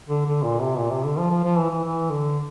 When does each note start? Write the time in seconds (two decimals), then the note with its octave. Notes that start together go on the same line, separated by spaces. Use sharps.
0.09 D3
0.26 D3
0.43 A#2
0.62 C3
0.78 A#2
0.91 C3
1.05 D3
1.19 F3
1.31 F3
1.44 F3
1.58 E3
1.71 E3
1.84 E3
2.11 D3